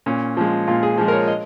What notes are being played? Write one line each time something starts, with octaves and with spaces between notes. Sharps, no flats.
A#2 C#4
F3 G#3
A#2 F4
G#4
F3 G#3
A#4
C#5
D#5